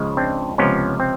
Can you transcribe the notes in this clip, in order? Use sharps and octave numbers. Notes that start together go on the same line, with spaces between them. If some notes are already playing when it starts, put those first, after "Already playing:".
Already playing: C#2 C#3 F3 G#3
C4 D4
C#2 C3 F3 B3 C#4
C4